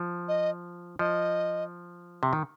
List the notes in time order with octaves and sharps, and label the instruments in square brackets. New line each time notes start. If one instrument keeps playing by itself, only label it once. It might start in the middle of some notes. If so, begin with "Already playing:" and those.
Already playing: [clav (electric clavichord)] F3
[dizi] D#5
[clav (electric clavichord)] F3 [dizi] D#5
[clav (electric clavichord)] C3
D#3